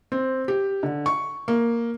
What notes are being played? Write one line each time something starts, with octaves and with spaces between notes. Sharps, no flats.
C4
G4
D3
C#6
A#3